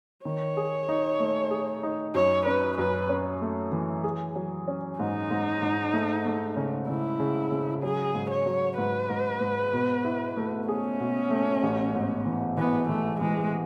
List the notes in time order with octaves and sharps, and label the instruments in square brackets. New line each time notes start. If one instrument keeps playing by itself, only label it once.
[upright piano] D#3 [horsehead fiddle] C#5
[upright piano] G#4
D#4
A3
G#4
D#4
[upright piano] F#2 [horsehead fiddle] C#5
[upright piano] C#4 [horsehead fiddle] B4
[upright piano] F#2 [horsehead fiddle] B4
[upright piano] C#4
A3
E3
G#4
F#3
C#4
[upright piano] G#2 [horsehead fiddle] D#4
[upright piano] G#2
G#2
A3
A3
C#3
[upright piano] C#3 [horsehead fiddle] E4
[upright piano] C#3
C#3
[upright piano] F#3 [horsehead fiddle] G#4
[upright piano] G#2
[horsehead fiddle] C#5
[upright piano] F#3
[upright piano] G#2 [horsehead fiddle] B4
[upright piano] G#2
G#2
B2
E4
A3
[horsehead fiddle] C#4 [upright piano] G#4
[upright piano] B2
A3
A1
G#2
E3
[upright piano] E3 [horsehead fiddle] B3
[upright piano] E3 [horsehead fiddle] A3
[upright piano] E3 [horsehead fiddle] G#3